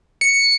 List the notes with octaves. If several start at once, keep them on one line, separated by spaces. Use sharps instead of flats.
C#7